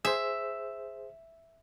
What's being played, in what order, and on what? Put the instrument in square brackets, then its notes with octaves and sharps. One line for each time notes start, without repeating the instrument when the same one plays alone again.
[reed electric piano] G#4 C5 [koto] E5